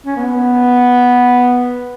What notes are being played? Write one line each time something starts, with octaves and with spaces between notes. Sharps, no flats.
C#4
B3